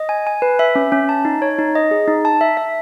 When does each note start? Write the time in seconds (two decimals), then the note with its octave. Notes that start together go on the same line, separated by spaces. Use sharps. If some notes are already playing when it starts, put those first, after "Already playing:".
Already playing: D#5
0.09 G#5
0.27 G#5
0.42 B4
0.59 E5
0.75 C#4
0.92 C#4
1.09 A5
1.25 D#4
1.42 C#5
1.58 D#4
1.75 D#5
1.91 G#4
2.08 D#4
2.25 A5
2.41 E5
2.57 E5